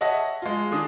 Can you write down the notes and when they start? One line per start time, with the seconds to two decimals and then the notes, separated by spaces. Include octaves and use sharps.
0.01 C#5 D#5 E5 F#5 A5 A#6
0.42 G#3 F4
0.71 D#3 D4 G#4 D#6